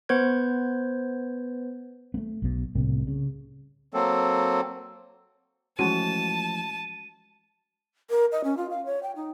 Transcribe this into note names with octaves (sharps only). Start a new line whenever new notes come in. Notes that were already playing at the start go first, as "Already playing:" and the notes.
B3 B4 C5 G6 G#6
A3 B3
B1 B2
C2 A2 C3 A#3
C#3
F#3 A#3 C4 A4
E3 F3 G#3 A3 C#4 F#4 A5 D#7
A#4
D#5
C#4
F4
F5
C#5
G5
D#4